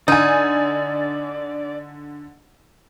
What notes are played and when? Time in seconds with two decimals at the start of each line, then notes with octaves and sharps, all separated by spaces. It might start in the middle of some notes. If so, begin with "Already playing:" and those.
0.08 D3 D#4 D5 G#5